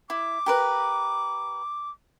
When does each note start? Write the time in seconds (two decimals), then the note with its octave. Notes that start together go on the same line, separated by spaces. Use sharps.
0.10 E4 D6
0.46 G4 A#4 B4